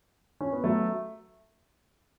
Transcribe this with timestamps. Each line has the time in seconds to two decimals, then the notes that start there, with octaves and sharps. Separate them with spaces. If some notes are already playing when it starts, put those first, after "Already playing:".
0.41 C#4
0.53 B3
0.64 F#3 A3